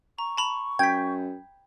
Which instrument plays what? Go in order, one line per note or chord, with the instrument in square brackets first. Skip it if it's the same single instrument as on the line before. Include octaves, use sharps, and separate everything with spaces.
[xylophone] A#5 [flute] C#6
[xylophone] A5 B5 F7
[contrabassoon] F#2 [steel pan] G5 [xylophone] G#6 B6